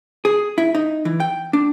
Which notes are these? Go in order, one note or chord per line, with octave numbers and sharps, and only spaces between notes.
G#4
E4
D#4
E3
G5
D4